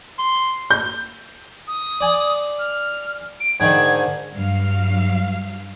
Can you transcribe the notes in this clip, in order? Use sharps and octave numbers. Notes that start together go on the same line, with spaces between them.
C6
G6
D#6
D5 G#5
F6
D7
G#2 D3 D#3 G#6
G2 F#3 F5